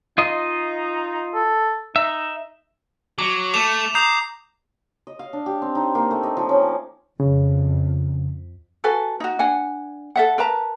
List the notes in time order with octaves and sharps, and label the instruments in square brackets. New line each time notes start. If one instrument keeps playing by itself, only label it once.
[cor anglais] D#4 [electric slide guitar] F4 D#5
[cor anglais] A4
[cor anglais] D#4 [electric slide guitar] E5
[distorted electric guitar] F#3 [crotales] D6
[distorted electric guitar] A3 [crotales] D6 E7 F7
[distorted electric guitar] A#5 [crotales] D#6 G6 C7
[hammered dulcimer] D#5
F5
D4
G4
C4
D#4
A#3
A3
D#5
F3
C#4
D6
[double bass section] F2 [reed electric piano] C#3
[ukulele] F#4 A4 B4 G#5
D#4 F#4
D4 F#5 G#5
A4 E5 F#5
A#4 B4 A5 A#5